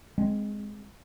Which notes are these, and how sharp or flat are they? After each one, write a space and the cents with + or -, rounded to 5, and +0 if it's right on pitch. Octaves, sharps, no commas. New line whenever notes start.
G#3 +0 C4 +0